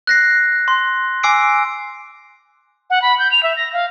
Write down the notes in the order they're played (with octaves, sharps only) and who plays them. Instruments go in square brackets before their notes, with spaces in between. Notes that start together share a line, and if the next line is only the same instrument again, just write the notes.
[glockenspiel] F#6 A#6 C7
C6
G#5 D6 E6 C7 D7
[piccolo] F#5
B5
G6
F7
E5
A#6
F5